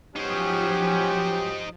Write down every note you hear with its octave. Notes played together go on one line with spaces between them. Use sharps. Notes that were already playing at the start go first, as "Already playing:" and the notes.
F3 F#3 B3 C#4 D#4 G4 C5